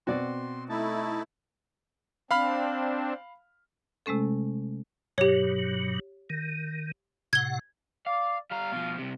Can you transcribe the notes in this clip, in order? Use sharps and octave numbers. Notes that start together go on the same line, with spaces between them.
B2 C4 F#4 D5 C6
A3 D#4 E4 A5
C4 D4 F5 B5 F6
C3 G#3 A3 C#4 A4
G2 B2 F#3 G4 C#5
D#3
A2 C3 F#5 G#6 G7
D5 F5
G3 F5 A#5
B2 F3
C2 C3